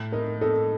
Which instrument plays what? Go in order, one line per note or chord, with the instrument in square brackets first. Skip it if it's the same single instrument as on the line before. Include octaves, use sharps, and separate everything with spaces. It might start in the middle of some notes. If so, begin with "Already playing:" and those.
Already playing: [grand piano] A2
[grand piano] D#4 [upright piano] A#4
[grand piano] D#4 [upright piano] A4